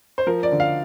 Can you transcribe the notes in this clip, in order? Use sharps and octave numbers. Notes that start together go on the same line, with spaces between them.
C5
F3 A#4
D5
D3
F5